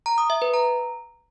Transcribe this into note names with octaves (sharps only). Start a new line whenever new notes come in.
A#5
D#6
E5
B4
A#5